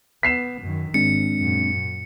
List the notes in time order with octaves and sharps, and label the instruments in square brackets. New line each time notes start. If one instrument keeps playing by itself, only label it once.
[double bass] B3 [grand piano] B6 C7 E7
[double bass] F#2 D#3
[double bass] G#1 [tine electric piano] G#3 C4 D4 [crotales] C#7
[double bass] F#2 A#2